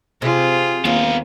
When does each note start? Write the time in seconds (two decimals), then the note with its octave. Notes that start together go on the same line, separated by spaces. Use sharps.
0.22 C3 F4 G#4
0.85 D#2 B3 F5